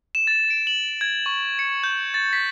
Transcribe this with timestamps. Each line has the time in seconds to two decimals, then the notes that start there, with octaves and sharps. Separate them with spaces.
0.15 E7
0.27 A6
0.50 D7
0.67 F#7
1.01 G#6
1.26 C#6
1.59 C#7
1.84 G6
2.14 A6
2.33 B6